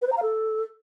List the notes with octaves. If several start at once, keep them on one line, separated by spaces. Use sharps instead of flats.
B4
C5
A#5
F5
A4